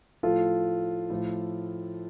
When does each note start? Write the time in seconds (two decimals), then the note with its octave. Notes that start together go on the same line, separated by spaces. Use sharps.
0.23 A2 F3 F4 A4
1.10 A2 F3